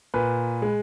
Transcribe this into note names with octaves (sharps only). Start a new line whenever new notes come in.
A#2 B4
G#3